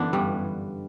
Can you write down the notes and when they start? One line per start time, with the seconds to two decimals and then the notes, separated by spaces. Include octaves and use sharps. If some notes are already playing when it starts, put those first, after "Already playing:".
Already playing: F#2 D3 E3 B3 D4
0.13 G2 G3